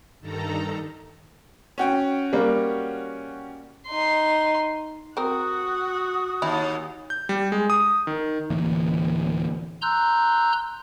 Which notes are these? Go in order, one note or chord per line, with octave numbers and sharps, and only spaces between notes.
G2 D#3 A4 A#5
C#4 F#4 G5
G3 A#3
D#4 C6
C4 F#4 A#4 F#5 D#6
D#2 E4
G6
G3
G#3
D#6
D#3
D1 E3 A#3
A#5 C6 E6 F#6 G6